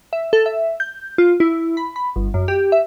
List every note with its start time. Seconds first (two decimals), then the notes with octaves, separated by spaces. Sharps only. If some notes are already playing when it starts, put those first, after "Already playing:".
0.13 E5
0.33 A4
0.46 E5
0.80 G6
1.18 F4
1.40 E4
1.77 B5
1.96 B5
2.16 G1
2.34 F#2
2.48 G4
2.72 E5